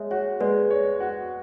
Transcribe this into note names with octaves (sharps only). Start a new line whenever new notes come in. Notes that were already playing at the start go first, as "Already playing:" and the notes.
Already playing: G#3 C#5 E5
F#4 C#5
G#3 B4 D5
C#5
F#4